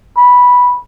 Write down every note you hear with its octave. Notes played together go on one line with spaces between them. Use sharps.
B5